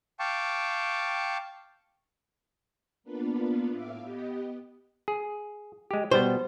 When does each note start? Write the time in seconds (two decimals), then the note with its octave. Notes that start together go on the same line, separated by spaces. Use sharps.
0.19 F5 G5 A5 C#6 D6
3.04 A#3 B3 D4 F4 B4
3.71 A2 E5 F5 D6
4.03 B3 G4 D#5
5.08 G#4
5.91 G#3 G4
6.11 B2 G3 B3 C5